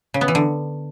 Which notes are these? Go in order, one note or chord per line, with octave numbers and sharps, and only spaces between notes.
C#3
B3
E3
D3